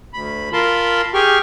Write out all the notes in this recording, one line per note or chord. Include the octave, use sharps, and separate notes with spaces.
D2 B5
F4 A#4 A5 B5 C6
G4 G#4 G5 C#6 F6